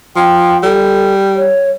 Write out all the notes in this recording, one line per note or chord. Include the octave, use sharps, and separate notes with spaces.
F3 G5
G3 A4
C#5